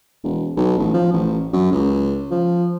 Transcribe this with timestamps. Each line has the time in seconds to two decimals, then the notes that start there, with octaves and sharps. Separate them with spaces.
0.24 E1
0.57 B1
0.78 A1
0.94 F3
1.13 A1
1.53 F#2
1.72 C#2
2.31 F3